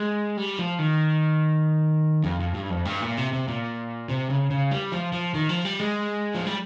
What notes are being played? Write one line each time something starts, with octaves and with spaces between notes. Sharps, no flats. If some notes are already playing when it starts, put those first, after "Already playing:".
Already playing: G#3
G3
F3
D#3
F2
F2
G2
F2
G2
A#2
C3
C3
A#2
C3
C#3
C#3
G3
F3
F3
D#3
F3
G3
G#3
F3
G3